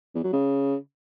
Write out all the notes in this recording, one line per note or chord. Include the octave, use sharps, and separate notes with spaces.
E2
F#3
C#3